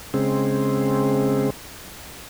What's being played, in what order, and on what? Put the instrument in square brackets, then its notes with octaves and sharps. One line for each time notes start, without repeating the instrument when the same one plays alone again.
[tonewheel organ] C#3 G#3 C4